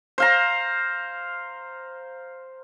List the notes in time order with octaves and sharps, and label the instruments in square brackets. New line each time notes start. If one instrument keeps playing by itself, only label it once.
[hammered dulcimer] C5 F5 A#5